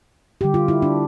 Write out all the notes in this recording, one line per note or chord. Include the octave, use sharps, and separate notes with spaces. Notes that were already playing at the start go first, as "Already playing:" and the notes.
D3 G3 G4
F4
E4
D4